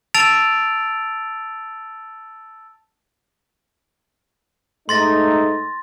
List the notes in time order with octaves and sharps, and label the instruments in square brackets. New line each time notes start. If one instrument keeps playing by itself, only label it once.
[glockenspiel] A5 E6 A6 D7 F7
[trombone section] G#2 A3 D#4 [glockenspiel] C6 A6 A#6